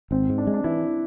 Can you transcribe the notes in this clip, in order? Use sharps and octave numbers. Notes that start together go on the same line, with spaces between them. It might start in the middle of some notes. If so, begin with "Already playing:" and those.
G#1 C4
G#2
D4
G#3
D4
E3 E4